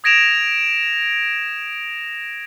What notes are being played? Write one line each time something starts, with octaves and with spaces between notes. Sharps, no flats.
D#6 G#6 A#6 D7 E7 F7